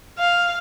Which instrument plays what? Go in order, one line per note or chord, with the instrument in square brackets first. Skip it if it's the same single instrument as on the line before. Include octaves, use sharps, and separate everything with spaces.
[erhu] F5